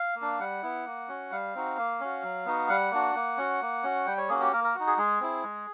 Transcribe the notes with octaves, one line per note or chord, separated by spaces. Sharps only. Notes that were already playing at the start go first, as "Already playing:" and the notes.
Already playing: F5
A#3
D4
G3 F#5
B3 E4
A#3
C#4 F#4
G3 F5
C4 D#4 F#4
A#3
C#4 F#4
F#3
B3 D#4 F#4
G3 F#5
A#3 D4 F#4
A#3
C#4 F#4
A#3
C#4 F#4
G3 G5
C#5
A#3 C#4 F#4 G#4
G4
A#3 A#4
A#4
D#4 F#4
G#4
G#3 G#4
C4 E4
G#3